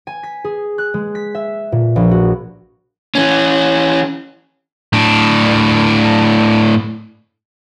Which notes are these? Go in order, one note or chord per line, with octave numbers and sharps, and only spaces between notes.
G#5
B6
G#4
F#6
G#3
B6
E5
A#2
A#1
F#4
E3 C#4
A2 D4